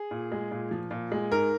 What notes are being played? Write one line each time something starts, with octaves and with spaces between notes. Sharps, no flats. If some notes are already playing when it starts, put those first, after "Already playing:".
Already playing: G#4
A#2
G#3
A#2
F3
A#2
G#3
G#2 A#4